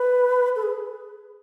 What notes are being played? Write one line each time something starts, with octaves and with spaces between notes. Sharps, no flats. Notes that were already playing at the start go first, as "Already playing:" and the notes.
Already playing: B4
A4
G#4